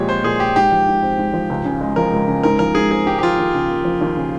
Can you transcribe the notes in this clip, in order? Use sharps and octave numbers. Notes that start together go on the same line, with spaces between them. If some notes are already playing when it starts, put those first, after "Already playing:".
Already playing: A#2 F3 G#3 G4 C#5
C4 C5
A#2 G#4
G#3 G4
G#2 G4
F3
G#2
C4
G#2
F3
C#2
C#3
G#3
F3 A#4
C#2
C#3
G#2 A#4
F3 A#4
G#2 G#4
C4 G#4
G#2 G4
G4
F3 F4
D#2
C#3
A#3
F3
D#2
C#3